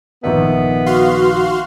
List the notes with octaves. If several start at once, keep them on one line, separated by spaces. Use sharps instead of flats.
A#1 D#3 B3 E5
F#4 F5 C6